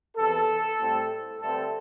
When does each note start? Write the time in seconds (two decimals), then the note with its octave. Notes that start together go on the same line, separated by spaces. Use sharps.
0.16 E2 C3 E3 A4
0.79 A2 G3 C4
1.41 G2 D3 A3 C4 A4